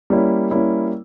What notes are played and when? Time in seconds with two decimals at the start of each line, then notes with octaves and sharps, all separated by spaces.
0.10 G3 A#3 C#4 E4
0.51 G3 A#3 C#4 E4